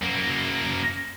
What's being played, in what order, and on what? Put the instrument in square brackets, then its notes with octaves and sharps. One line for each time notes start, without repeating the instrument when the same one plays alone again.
[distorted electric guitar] F#2 A#3